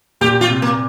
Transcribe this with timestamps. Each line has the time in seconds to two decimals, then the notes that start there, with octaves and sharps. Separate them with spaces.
0.21 A#2 G4
0.41 F4
0.48 C3
0.62 A#3